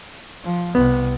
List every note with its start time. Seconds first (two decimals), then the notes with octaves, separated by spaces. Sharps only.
0.44 F3
0.75 C2 C3 B3